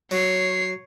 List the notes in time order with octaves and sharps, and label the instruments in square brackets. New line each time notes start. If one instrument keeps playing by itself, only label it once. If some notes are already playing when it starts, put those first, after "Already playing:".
[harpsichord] F#3 [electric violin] C#5 C7